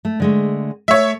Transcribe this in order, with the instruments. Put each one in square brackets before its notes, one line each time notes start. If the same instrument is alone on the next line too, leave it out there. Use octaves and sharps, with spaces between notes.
[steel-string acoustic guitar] A3
D3 G#3 A3
[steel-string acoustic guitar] A3 [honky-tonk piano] C#5 E5